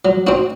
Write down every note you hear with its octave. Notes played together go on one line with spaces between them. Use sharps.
F#3
C4 D#4 F#4